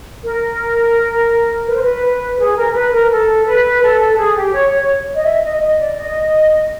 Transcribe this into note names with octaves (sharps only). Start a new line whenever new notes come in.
A#4
B4
C5
B4
G#4
A#4
B4
A#4
A4
B4
A4
A4
G#4
G4
C#5
C#5
D#5
E5
D#5
D#5
D5
D#5